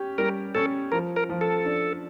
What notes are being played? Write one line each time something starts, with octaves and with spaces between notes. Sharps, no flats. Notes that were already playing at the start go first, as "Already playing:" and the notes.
Already playing: C#4 G4
G3 A#4
C#4 A4
F3 A#4
A#4
F3
A4
D4